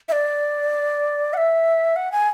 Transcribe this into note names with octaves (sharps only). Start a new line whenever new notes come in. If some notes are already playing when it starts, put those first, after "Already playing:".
E5
D5
F#5
E5
F#5
G#5